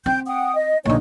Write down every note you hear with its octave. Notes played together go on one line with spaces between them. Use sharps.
C4 G5 G6
F#5 G5 D#6
D#5
A#1 D3 D#4 C#5 C#6